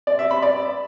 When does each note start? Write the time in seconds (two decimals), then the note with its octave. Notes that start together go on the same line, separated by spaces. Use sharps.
0.07 D5
0.19 E5
0.31 B5
0.42 D5